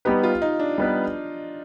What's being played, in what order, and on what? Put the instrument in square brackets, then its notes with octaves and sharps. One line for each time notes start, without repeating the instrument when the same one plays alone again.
[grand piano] G3 B3 D#4 B4 [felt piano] G4
[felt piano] F4
D#4
D4
[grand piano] G3 B3 D#4 B4